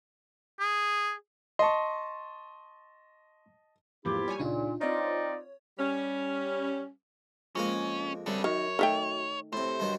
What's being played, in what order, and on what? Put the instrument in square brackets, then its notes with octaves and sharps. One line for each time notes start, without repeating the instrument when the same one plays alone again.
[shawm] G#4
[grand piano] D#5 A5 [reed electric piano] C6 C#6
[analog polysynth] E2 G#2 F3 [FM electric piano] A#3 [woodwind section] E4 F4 G4
[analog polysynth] G3 C#5 G#5
[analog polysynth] C#2 [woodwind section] A#2 [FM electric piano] D4 D#4 F4
[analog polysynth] C4 F4 [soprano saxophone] D#4 [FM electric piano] C#5 [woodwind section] D5
[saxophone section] G3 C#4
[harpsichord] F2 G#3 A#3 [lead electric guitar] C#4
[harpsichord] C2 C#3 G3 [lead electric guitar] A4 D5
[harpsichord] F#2 [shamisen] D#3 [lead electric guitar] C#5
[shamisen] D#3 A3 G5
[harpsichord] A2 C3 [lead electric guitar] C5
[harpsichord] G2 D#3 F#3